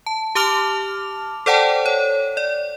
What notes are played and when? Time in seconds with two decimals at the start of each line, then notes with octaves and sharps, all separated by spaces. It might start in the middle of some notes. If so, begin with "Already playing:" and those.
0.06 A5
0.35 G4 A5 D6 F6 F7
1.46 A4 C5 D5 F#5 G5 A5
1.86 C#5
2.37 D5